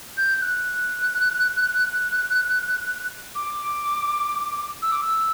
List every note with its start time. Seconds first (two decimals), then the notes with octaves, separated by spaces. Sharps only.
0.17 G6
0.42 F#6
3.35 D6
4.82 E6
4.92 D6
5.02 E6